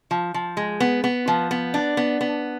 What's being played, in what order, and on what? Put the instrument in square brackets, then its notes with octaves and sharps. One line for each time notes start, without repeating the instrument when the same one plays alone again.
[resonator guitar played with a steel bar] F3
F3
G#3
B3
B3
F3
B3
D4
B3
B3